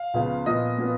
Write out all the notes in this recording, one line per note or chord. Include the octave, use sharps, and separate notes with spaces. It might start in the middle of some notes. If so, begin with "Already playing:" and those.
Already playing: F5
C#2 C#3 F3 B3
A#2 F3 B3 D#5
A#2 F3 B3